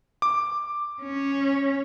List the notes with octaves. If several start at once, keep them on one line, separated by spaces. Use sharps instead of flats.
D6
C#4